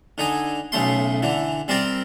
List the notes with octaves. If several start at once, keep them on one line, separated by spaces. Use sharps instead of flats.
D3 D#4 G#5
B1 C#3 A3 C6
D3 E3
G3 C4 A#4 D5